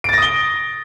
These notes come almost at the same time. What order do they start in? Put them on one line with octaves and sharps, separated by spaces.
D7 A6 A#6 D#6 G7